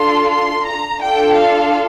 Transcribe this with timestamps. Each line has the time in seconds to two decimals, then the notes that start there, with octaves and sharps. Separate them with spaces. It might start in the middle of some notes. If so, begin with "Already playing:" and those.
Already playing: D4 F4 A4 C6
0.29 C6
0.65 A#5
1.00 D4 F4 A4 G5
1.36 F5